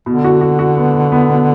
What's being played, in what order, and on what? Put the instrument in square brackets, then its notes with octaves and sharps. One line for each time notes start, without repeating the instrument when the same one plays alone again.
[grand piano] B2 [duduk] D3
[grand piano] F#4
F#4
F#4
B3
B2
B3
B2